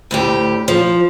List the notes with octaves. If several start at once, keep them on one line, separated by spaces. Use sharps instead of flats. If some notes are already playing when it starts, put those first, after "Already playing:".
D2 A2 G4
F3